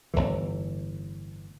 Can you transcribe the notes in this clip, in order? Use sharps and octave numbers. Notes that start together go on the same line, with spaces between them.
G1 C#2 A2 E3